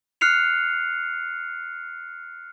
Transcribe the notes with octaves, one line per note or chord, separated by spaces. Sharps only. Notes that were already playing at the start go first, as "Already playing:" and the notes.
F6 F#6 C7 C#7 F7